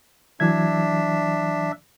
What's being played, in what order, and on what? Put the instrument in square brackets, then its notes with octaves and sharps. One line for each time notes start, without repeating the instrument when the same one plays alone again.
[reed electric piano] E3 F#3 G#6 [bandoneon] D4 E5